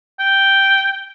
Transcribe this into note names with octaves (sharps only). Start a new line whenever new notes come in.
G5